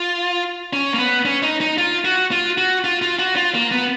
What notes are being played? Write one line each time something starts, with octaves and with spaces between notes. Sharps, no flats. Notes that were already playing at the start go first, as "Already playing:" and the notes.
Already playing: F4
C#4
A#3
B3
C#4
D#4
D#4
F4
F#4
F4
F#4
F4
F4
F#4
F4
A#3
B3